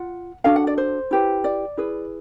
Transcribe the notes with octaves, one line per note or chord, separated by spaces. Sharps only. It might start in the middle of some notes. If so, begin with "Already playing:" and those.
Already playing: F4 F#5
D4 F#4 A4 F5
F#5
D5
C5
E4 G4 B4
D5
E4 G#4 B4